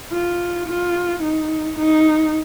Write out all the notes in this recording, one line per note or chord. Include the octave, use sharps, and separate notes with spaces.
F4
F4
D#4
D#4